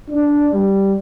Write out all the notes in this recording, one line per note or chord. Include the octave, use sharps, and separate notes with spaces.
D4
G3